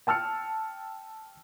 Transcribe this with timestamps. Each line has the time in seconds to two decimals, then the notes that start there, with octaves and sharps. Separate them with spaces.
0.07 G5 A5 E6 F6 C#7